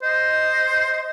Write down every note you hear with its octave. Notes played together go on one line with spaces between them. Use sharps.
C5 D#5